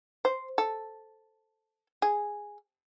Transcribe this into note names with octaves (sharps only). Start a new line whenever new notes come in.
C5
A4
G#4